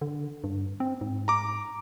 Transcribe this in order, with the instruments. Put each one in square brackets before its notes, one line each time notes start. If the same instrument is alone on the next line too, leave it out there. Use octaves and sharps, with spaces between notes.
[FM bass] D3
G2
C4
G#2
[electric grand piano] A#5 D6